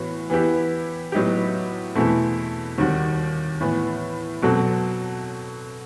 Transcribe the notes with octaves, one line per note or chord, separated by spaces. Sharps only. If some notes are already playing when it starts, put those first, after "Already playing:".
Already playing: A2 E3 B3 F#4
E3 B3 E4 G4
A2 F#3 B3 D#4 G4
E2 B2 A3 C4 E4
D#2 D#3 G3 C4 F#4
A2 E3 B3
B2 F#3 C4 F#4 A4